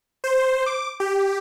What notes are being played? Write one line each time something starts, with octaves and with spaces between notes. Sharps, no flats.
C5
D6
G4